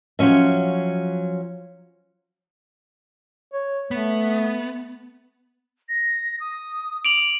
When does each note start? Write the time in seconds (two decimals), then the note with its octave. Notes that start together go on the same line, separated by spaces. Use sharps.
0.19 F3 F#3 C#4 E5
3.53 C#5
3.91 A3 B3
5.89 A#6
6.40 D#6
7.05 D6 D7 F7 F#7